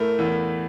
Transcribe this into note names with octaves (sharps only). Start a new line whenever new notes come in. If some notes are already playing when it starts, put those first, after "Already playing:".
Already playing: A2 A3 A#4
E2 E3